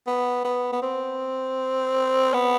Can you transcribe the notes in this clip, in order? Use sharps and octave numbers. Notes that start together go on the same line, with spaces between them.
B3
B3
B3
C4
B3